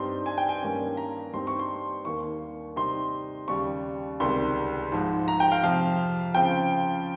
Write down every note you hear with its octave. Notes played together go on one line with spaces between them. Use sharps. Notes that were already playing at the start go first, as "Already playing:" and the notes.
Already playing: G2 G3 C4 D#4 C6
G#5
G5
G#5
G2 D#3 A#3 C#4
A#5
G2 G3 C4 D#4 C6
C#6
C6
D#2 D#3 A#3 C#6
C3 G3 C4 D#4 C6
D#2 C#3 G3 C#6
C#2 C3 D#3 G3 C6
G#2 F3 G#3
A#5
G5
F5
F2 C3 F3 F5
C#3 F3 C4 F4 G5